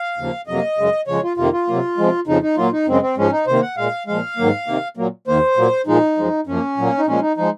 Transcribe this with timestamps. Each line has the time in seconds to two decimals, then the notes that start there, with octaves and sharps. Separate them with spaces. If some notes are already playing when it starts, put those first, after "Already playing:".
Already playing: F5
0.17 D#2 C#3 F3 A#3
0.47 F2 C3 F#3 A#3 D#5
0.78 F#2 C#3 G#3
1.07 F2 C#3 F3 G#3 C#5
1.23 F4
1.37 F2 C3 D#3 A#3 F4
1.53 F4
1.67 C3 F#3 A#3
1.98 C3 F3 G#3
2.27 F2 C#3 F3 D#4
2.42 D#4
2.57 A#2 F#3 A#3 F4
2.73 D#4
2.87 F#2 C#3 G#3 C4
3.02 C4
3.17 G#2 F3 G#3 C#4
3.32 D#4
3.47 C3 D#3 A#3 C5
3.62 F#5
3.77 A#2 G#3 F5
4.06 A#2 F3 G#3 F5
4.37 G#2 D#3 F#3 A#3
4.67 C3 D#3 A#3
4.97 A#2 F#3 A#3
5.27 D#2 D#3 A#3 C5
5.57 A#2 F#3 A#3
5.87 A#2 F3 G#3 D#4
6.17 F#2 F3 G#3
6.47 F#2 F3 A#3 C#4
6.77 A#2 F#3 A#3
6.98 D#4
7.07 A#2 F3 G#3 C#4
7.21 D#4
7.37 F3 G#3 D#4